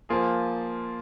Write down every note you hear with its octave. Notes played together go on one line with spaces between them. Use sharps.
F3 A#3 F4 G#4